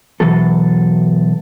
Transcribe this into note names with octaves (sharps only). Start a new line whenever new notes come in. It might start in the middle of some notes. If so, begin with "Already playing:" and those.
B2 E3 F#3 A4